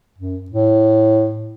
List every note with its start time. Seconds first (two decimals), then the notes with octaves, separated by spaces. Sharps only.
0.19 F#2
0.50 A2